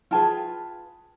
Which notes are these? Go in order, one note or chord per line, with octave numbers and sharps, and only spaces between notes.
F4 G#4 B4 G5 A5